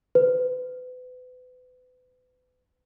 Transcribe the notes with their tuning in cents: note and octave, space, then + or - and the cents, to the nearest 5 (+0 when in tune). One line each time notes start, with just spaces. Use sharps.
B4 +35